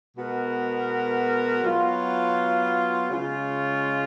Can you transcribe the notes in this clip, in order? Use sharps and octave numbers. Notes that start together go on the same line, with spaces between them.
B2 G#3 B3 F#4 A#4
F#3 B3 F4
C#3 G#3 C#4 F4